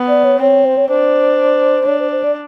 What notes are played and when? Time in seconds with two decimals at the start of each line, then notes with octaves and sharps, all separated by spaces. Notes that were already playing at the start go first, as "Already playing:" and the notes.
Already playing: B3
0.08 D5
0.24 C#5
0.41 C4 C#5
0.65 C5
0.77 C#5
0.88 D4 C5
1.86 D4 C#5
2.00 C5
2.12 C5
2.24 D5